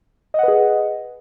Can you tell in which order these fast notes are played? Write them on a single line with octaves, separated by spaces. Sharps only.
D#5 F#5 B4 G#4